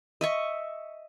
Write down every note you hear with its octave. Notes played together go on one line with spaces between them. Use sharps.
D#5 E5 C#6